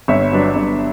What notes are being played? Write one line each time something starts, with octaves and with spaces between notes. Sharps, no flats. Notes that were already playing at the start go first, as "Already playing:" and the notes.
G1 C#5 E5
G2 F#3 B3 D4
G1